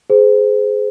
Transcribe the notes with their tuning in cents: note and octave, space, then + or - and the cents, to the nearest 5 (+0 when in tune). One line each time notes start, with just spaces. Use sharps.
G#4 +15 C5 -25